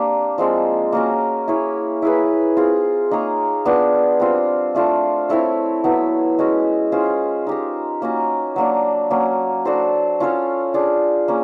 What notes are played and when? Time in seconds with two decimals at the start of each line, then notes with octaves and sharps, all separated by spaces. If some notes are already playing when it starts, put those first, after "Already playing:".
Already playing: A#3 C4 D4 G4
0.38 F3 G#3 C4 F4
0.92 A#3 C#4 F#4 A#4
1.48 E4 G#4 C#5
2.02 E4 G#4 B4
2.57 C4 F4 G#4
3.11 A#3 D#4 G#4 C#5
3.65 B3 D4 F4
4.20 G3 C4 F4
4.75 A3 D4 F4 A4
5.29 C4 E4 A4 C#5
5.84 F#3 B3 E4
6.38 G#3 C#4 F#4
6.92 C#4 F4 G#4 C5
7.47 D#4 G4 A#4
8.02 A#3 C#4 F#4
8.56 F#3 A#3 D4
9.10 F#3 A#3 C#4
9.65 D4 F#4 A4 C5
10.20 C#4 F4 A4 C#5
10.74 D4 F4 G#4
11.28 A#3 C#4